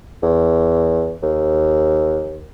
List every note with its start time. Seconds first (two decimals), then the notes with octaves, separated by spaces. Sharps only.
0.23 E2
1.23 D#2